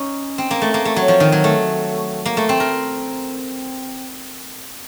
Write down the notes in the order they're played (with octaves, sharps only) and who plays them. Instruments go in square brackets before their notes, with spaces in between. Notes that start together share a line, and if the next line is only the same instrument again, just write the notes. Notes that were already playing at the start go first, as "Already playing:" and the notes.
Already playing: [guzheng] C#4 D#4
C4
A#3
A3
A#3
A3
F#3
F3
D#3
F#3
A3
A#3
A3
C4
A#4